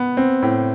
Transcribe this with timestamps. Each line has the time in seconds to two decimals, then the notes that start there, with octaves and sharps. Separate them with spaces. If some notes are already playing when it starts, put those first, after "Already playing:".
Already playing: B3
0.17 C4
0.42 A2